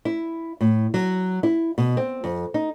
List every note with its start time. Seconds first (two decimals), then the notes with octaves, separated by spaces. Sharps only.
0.05 E4
0.61 A2
0.94 F#3
1.43 E4
1.78 B2
1.97 C4
2.24 F2
2.54 D#4